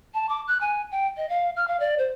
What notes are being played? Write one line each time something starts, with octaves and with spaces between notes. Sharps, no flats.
A5
D6
F#6
G#5
G5
D#5
F5
F6
F5
D5
C5